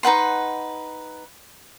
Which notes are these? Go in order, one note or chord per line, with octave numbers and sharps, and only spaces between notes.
D#4 B4 F#5 C6